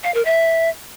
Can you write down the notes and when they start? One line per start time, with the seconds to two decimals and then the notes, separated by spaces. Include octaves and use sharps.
0.03 F5
0.14 A#4
0.25 E5